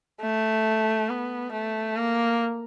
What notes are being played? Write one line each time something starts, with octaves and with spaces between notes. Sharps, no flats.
A3
B3
A3
A#3